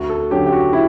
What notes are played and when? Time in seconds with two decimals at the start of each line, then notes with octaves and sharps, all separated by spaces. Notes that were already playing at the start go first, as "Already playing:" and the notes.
Already playing: D2 F#4
0.10 A4
0.31 D3 F#3 C#4 G4
0.46 G4
0.52 F#4
0.73 E4